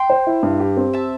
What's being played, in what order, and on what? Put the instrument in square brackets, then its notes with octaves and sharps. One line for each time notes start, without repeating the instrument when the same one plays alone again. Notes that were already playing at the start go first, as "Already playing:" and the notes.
Already playing: [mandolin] G5 C6
[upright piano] C5
E4
G2
G4
C4
[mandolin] E5 A5